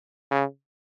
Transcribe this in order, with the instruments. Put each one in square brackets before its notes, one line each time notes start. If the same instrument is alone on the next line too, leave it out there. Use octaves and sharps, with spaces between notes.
[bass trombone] C#3